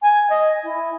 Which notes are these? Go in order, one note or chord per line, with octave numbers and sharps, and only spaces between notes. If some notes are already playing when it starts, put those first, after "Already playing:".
G#5
D#5
E4